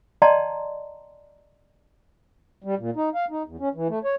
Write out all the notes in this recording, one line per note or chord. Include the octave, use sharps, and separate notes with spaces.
D5 D#5 F#5 A5 A#5 C6
G3
A#2
D#4
F5
D#4
E2
C#4
E3
A3
C#5